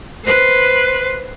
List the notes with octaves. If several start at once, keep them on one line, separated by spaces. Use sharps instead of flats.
B4 C5